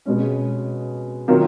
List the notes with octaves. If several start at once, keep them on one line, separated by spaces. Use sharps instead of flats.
B2 G#3 C#4
D#3 F#3 A#3 F4